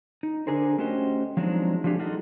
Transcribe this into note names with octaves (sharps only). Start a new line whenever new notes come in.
D#4
D3 D4 G#4 A#4 C5
A3 C#4 F#4 G4 C5 D#5
F3 F#3 G#3 C4 D4 D#4
F3 G3 A3 D4 G4 G#4
D#4 F4 F#4 A4 D#5